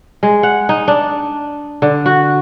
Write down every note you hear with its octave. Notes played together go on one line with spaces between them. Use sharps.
G#3
F#5
D#4
D4
D3
F#4